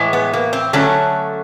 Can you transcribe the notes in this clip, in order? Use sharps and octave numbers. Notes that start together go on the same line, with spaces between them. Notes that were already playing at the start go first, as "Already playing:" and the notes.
Already playing: A2 E3 G#3
B3
A#3
C4
D3 F#3 A3 C#4